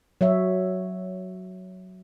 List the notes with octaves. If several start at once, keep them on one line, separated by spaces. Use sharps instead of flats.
F#3 C#5 E5